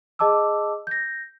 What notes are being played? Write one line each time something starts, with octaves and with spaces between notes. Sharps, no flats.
G#4 D#5 A5 D6 E6
G6 A#6